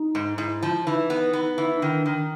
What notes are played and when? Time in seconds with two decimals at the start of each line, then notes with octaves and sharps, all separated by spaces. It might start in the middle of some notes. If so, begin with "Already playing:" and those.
Already playing: D#4
0.15 G#2
0.38 G#2 E4
0.63 F3
0.86 E3 D#4
1.10 B3
1.33 B3
1.58 E3
1.75 D#4
1.81 D#3 D4
2.06 D#3